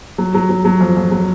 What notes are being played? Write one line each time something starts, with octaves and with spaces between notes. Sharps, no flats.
F#3
F#3
F#3
F#3
F2
F2
F#3